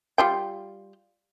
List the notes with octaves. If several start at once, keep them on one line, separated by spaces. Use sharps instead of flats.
G3 F4 G5